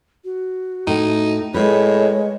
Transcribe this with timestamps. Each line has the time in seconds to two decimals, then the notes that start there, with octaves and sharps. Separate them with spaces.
0.25 F#4
0.87 A2 D#4
1.54 A2 G#3 B4 C#5